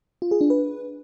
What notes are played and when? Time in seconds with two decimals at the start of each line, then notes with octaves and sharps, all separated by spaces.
0.22 F4
0.31 G#4
0.41 D4
0.50 B4